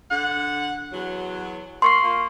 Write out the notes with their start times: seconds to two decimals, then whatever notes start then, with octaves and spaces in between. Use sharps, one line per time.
0.11 D3 F#5
0.93 E2 F#3
1.82 A#3 C6 C#6 C7
2.03 A#3 F4